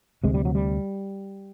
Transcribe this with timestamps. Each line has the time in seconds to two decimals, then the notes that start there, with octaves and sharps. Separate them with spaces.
0.24 D2 C3 G#3
0.34 G3
0.45 F#3
0.55 G3